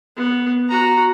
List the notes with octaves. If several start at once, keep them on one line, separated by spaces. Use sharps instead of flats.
B3
F#4 A#5